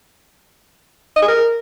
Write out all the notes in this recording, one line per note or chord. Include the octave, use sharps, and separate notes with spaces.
D#5
G#4
A#4